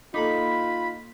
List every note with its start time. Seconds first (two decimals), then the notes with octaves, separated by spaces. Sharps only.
0.14 A#3 D#4 F4 A4 B5 D6